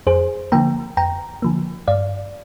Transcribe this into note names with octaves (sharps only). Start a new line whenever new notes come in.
F2 G#4 C5
D3 F3 A#3 G5 A#5
F2 G5 A#5
D3 F3 A#3
G2 D5 F5